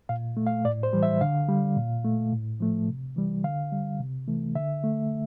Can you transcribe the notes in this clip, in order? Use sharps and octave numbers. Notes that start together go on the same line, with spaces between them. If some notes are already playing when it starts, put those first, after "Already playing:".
A#2 F5
A3
F5
A2 D5
C5
E3 G3
E5
D3 F5
G3
A#2
A3
A2
F3 A3
C3
E3 G3
D3 F5
G3
C3
E3 A3
D3 E5
A3